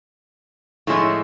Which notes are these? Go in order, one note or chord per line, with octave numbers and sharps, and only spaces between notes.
A2 F3 G#3 C#4 E4